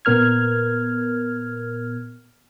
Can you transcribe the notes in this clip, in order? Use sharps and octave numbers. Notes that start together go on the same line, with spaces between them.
A#2 B3 A#4 F6 G#6